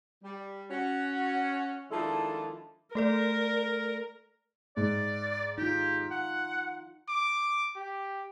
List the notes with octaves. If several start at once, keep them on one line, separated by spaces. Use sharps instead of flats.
G3
C#4 F#4
D#3 F3 G#3 D4 E4 A4
A3 A4 A#4 D5
G#2 D5
D#4 F4 G4
F#5
D6
G4